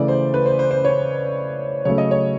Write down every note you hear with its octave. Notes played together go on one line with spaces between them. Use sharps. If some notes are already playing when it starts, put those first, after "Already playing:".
Already playing: C#3 E3 A3 D5
C5
B4
C5
C5
C5
C#5
C#3 F#3 A3 C#5
D#5
C#5